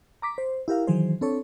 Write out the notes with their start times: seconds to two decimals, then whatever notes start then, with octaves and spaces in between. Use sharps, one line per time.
0.22 A#5 D6 B6
0.38 C5
0.68 E4 G4 A#4 F5
0.87 D#3 E3 F#3 G#4 C5
1.21 C4 D4 A4 C#5